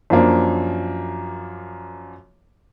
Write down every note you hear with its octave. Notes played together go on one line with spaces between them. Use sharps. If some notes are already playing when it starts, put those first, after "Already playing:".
F#2 F3 A#3 D4